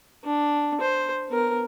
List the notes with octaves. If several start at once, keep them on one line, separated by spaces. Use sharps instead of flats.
D4
C5
B3 A#4